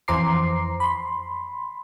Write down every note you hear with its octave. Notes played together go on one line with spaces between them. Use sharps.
F2 E3 C5 A#5 D6 C7
B5 C6